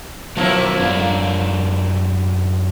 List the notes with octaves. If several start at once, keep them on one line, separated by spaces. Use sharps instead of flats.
F3 F#3 A#3 B3 C#4 E4
F#2 D4 F4